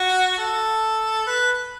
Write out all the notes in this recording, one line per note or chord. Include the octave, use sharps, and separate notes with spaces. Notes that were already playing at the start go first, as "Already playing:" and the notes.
Already playing: F#4
A4
B4